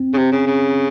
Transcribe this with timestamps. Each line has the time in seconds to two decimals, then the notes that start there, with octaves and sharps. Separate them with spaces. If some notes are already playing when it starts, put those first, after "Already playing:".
Already playing: C4
0.14 C#3
0.18 C3
0.32 C#3
0.46 C#3